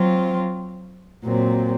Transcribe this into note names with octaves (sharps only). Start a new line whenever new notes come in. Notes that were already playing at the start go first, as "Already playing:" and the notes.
Already playing: F#3 C4 F4
A#2 F#3 C4